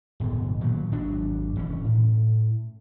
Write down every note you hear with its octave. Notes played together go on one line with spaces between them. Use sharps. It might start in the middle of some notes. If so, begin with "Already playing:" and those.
D1 G1 B2 D3
A#2 D#3 F3 F#3
G#1 F#3 D4
E1 E3 C#4
A2